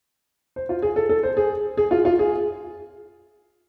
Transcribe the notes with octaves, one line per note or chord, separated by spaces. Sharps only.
C5
F4
G#4
A4
A4
C5
G#4
G#4
F4
F4
G#4